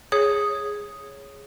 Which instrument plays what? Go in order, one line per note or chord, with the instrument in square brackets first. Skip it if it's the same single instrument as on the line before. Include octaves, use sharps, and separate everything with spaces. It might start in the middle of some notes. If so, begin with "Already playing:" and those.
[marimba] G#4 C#5 D#6